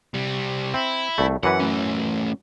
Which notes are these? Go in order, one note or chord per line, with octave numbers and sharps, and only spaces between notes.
C3 G3
C4 E4
C2 A3
F#2 E3 B4 F#5
A3 C#4